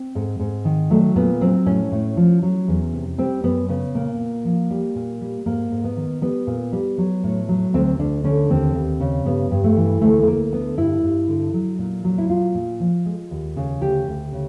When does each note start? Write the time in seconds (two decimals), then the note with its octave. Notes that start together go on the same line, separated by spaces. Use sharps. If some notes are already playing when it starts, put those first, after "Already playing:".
Already playing: C4
0.15 G#2
0.39 G#2
0.65 D#3
0.90 F#3 A3
1.16 A#2 B3
1.41 F#3 C4
1.66 A2 C#4
1.92 A2
2.17 F3
2.42 F#3
2.68 E2
2.93 C3
3.18 G3 C4
3.43 F#2 B3
3.69 C#3 B3
3.94 A#2 A#3
4.20 A#2
4.45 F3
4.70 G3
4.95 A#2
5.21 G3
5.46 G#2 A#3
5.71 G#2
5.84 B3
5.97 D#3
6.22 G3 B3
6.47 A#2
6.73 G3
6.98 F#3
7.23 A2
7.49 F#3
7.74 D2 C4
7.99 D2 D4
8.24 D3 C#4
8.50 D#2 C4
8.75 D#2
9.00 C#3
9.25 G2 B3
9.51 G2
9.64 A3
9.77 E3
10.01 D2 A3
10.23 A3
10.27 D2 A#3
10.52 D3 B3
10.78 G2 E4
11.03 G2
11.28 D3
11.54 F#3
11.79 A#2
12.04 F#3
12.18 E4
12.29 A#2 F4
12.55 A#2
12.80 F3
13.06 G#3
13.31 D#2
13.56 C#3
13.81 D2 G4
14.07 D2
14.32 C#3